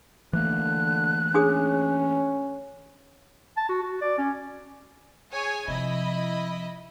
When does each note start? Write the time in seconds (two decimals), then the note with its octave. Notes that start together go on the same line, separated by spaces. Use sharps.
0.33 D3 E3 A3 A#3 F#6
1.34 C#4 D4 G#4 D#6
3.57 A5
3.69 F#4
3.83 F#4
4.02 D5
4.18 C#4
5.32 G#4 C#5 G#5
5.68 C3 F3 E4 D#5 B5